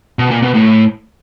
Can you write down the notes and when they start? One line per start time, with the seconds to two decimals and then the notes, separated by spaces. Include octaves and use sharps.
0.19 B2
0.31 A#2
0.42 B2
0.54 A2